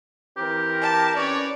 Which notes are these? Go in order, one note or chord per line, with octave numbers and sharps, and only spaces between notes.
E3 C4 G4 A#4
A5
C#4 B4 C#5 D5